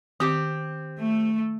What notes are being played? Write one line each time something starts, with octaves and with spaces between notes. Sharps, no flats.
D#3 C4 G4 D6
A3